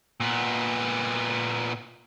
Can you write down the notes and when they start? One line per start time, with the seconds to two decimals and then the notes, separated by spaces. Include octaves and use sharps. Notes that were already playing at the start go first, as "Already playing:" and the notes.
0.20 A#2 B3